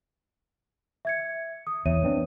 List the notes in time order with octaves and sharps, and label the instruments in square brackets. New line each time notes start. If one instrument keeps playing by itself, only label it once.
[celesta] E5 G#6 C#7
D#6
[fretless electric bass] E2 [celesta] C#5 E5 D#7
[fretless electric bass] B3 C4 D4